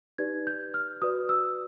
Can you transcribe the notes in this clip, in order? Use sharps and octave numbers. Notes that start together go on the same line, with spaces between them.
D#4 G4 B4 D5 G#6
G6
F6
F#4 B4 D5 D#6
E6